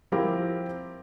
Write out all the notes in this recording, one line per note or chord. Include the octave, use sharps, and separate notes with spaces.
F3 C4 E4 G4 A#4